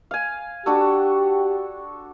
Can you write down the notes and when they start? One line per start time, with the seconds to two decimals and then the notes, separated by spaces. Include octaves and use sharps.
0.11 F5 G#5
0.66 D4 F#4 G4 A4